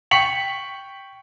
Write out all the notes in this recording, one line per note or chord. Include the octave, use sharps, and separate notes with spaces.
G5 C#6 B6 C#7 F#7